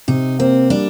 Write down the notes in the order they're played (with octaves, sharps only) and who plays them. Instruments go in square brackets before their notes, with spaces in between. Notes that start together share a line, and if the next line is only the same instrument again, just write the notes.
[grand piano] C3 [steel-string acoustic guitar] D#4
[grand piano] A#3 [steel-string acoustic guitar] C4
[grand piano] G3 [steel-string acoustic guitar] D4